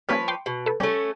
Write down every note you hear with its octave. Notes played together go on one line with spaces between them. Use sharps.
F3 G3 A#3 C#4 B4 C#5
G5 C6 D6
B2
A4 B4
G3 A3 C#4